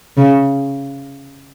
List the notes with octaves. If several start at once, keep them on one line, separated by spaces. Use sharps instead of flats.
C#3